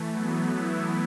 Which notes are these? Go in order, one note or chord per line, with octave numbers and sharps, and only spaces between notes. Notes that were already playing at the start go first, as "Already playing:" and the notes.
Already playing: E3 A3
F#3 B3
B3 E4